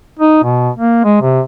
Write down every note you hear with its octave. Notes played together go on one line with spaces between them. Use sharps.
D#4
B2
A#3
G#3
C3